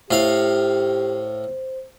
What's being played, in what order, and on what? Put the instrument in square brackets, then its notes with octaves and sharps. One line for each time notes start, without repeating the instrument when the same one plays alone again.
[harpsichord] A2 F5 [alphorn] G4 [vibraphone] C5